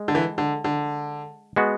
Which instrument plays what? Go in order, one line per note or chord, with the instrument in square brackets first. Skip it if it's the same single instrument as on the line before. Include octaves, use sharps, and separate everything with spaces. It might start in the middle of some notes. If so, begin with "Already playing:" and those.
Already playing: [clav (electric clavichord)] G#3
[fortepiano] D3
E3
D3
D3
[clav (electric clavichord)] G#3 B3 F#4